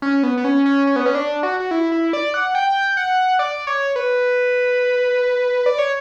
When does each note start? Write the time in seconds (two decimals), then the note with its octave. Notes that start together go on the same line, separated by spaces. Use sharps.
0.02 C#4
0.23 B3
0.37 B3
0.44 C#4
0.66 C#4
0.87 C#4
0.96 B3
1.06 C#4
1.15 D4
1.43 F#4
1.60 F#4
1.71 E4
1.92 E4
2.13 D5
2.34 F#5
2.55 G5
2.97 F#5
3.39 D5
3.67 C#5
3.96 B4
5.66 D5
5.78 C#5